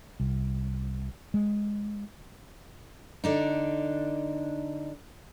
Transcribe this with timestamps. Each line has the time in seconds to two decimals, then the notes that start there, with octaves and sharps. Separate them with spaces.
0.20 C2
1.34 G#3
3.24 D3 D4 D#4